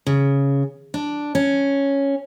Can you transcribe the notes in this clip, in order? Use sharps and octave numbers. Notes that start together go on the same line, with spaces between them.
C#3
D4
C#4